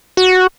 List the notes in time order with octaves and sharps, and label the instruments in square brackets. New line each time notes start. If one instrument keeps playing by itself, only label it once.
[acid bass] F#4